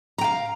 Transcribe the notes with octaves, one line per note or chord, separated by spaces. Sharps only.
F5 G5 A#5